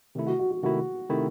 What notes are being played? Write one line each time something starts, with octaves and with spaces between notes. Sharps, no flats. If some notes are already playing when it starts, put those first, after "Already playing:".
C3 D#3 A3 E4
F#4
F#4
F#4
C3 D#3 A3 E4 F#4
C3 D#3 A3 E4